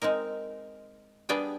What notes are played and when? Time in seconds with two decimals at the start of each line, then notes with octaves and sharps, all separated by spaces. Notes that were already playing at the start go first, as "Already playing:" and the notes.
0.02 G#3 C4 D#4 A#4
1.29 G3 B3 D4 G#4 G5